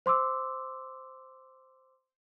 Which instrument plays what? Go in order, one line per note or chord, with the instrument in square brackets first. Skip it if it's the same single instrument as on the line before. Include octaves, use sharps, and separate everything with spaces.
[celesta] C5 C6 D6 E6